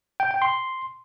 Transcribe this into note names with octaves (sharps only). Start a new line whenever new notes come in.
G5
G5
C6